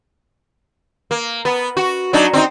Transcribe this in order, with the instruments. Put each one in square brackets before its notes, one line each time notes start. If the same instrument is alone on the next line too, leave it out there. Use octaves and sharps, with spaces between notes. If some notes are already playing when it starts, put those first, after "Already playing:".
[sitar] A#3
B3
F#4
F#3 D4 D#4
C4 D4 D#4